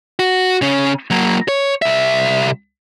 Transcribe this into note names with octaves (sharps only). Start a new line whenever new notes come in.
F#4
C#3 C#4
F#3 A#3
C#5
C2 E5